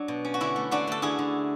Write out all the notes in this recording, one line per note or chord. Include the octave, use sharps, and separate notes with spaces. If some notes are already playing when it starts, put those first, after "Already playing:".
Already playing: F#3 D4
B2
C#4
F#4
D3 E4
A3
D3 D4 F#4
A3 A4
D3 E4 G#4
D3